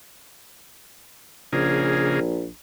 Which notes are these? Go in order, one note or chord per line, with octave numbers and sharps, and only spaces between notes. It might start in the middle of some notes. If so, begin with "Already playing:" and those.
A#1 C#3 A#3 G#4